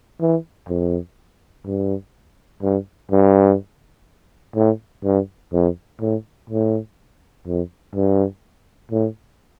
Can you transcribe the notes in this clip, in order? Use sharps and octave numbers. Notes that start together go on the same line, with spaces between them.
E3
F2
G2
G2
G2
A2
G2
F2
A2
A2
F2
G2
A2